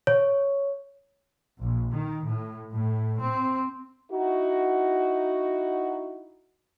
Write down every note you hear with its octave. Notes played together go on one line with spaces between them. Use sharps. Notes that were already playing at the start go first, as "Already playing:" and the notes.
C#5
A#1
D#3
A2
A2
C4
D#4 E4 F#4